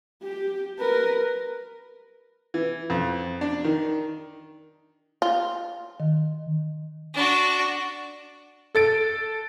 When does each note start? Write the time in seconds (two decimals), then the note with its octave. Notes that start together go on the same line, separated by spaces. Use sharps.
0.22 G4
0.79 A#4 B4
2.54 E3
2.90 F2
3.41 D4
3.64 D#3
5.22 F4
6.00 D#3
7.14 D4 F#4
8.75 A4 A6 D7